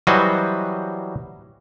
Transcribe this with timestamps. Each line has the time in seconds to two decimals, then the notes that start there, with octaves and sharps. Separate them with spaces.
0.07 E3 F#3 G3 F#4 C5 D#5